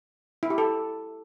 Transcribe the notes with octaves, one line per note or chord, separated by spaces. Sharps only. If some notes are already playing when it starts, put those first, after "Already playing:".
E4
G4
A4